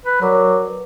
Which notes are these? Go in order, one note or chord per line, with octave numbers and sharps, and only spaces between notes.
B4
F#3 A#4 D5 D6
B4